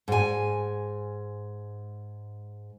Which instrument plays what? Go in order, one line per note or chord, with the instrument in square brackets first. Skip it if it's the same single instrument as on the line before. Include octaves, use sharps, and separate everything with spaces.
[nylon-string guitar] G#2 G#5